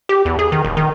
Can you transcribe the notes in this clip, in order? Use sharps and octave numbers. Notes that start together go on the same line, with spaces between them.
G4
E2
G#4
D#3
D#1
D#3